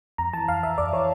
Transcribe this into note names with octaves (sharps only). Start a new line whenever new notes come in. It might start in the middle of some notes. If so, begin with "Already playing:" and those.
F2 A#5
E3 A5
F2 F5
E3 E5
F2 D5
E3 C#5